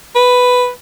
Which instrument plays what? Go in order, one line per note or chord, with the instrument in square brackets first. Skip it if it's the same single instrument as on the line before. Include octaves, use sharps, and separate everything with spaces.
[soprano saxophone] B4